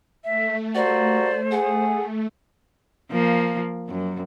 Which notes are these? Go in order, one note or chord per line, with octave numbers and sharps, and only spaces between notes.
A3 E5
G3 A#3 F#4 C5 D5
G#4 F#5
F3 A#3
F#2